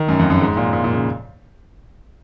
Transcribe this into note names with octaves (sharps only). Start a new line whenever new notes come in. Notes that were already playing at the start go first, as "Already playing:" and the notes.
Already playing: D#3
F#2
F2
F#2
G#2
A#2
A#2
A#2
C#3